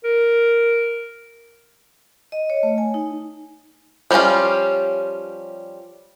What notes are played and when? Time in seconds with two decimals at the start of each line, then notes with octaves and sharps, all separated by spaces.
0.04 A#4
2.32 D#5
2.50 C#5
2.63 A3
2.78 G#5
2.94 D#4
4.11 F3 G3 C4 C#4 F4